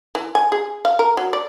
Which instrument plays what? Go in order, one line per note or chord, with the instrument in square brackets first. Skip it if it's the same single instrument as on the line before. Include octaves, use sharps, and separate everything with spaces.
[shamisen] E3
G#5
G#4
F5
A#4
F#3
D5